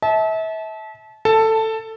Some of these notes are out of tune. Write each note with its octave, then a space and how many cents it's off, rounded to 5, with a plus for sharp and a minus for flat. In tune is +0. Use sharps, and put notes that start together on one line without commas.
E5 -35 A5 -25
A4 +10 A5 +0